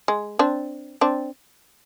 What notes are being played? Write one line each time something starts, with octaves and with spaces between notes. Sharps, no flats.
G#3
C4 D4
C4 D4